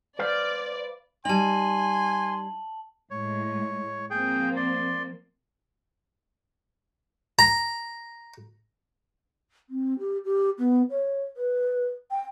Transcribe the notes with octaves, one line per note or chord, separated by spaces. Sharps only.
B4 C5 D5 F5
G3 D#4 G#5 A5 C6 F#7
A2 G#3 C#5
F3 A#3 C4 G#4 G5
D5 C6
A#5
C4
G4
G4
B3
C#5
B4
G5